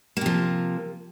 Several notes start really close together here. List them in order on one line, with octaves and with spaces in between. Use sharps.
A#3 C3 F3